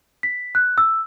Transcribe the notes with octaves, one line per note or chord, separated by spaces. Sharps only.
B6
F#6
E6